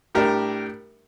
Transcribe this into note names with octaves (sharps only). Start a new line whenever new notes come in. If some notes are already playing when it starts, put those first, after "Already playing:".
A2 G3 D4 G4 A#4